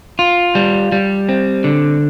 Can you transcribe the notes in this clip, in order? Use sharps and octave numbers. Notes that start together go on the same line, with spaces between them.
F4
G3
G3
C4
D3